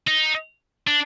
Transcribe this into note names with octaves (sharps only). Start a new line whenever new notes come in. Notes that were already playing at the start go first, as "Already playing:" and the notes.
D#4
D4